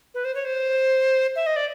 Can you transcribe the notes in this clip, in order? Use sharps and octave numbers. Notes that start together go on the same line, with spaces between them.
B4
C5
C#5
C5
E5
D#5
D5